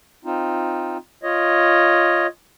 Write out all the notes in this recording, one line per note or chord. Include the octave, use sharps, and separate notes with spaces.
C4 D#4 F4
F4 C#5 D#5